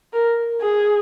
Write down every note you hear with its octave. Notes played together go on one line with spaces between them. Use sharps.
A#4
G#4